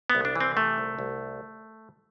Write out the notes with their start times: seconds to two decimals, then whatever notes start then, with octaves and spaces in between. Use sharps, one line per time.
0.10 B3
0.15 C2
0.25 D4
0.35 E3
0.41 C4
0.56 C3 A3
0.78 C2
0.99 C2